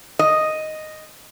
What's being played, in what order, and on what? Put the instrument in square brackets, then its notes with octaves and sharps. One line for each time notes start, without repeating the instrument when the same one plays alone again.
[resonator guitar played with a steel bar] D#5